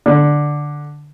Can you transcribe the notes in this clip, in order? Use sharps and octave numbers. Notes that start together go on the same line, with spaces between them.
D3